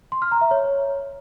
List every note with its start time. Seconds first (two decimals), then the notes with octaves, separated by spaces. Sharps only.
0.12 C6
0.22 F6
0.32 A#5
0.41 E5
0.51 C#5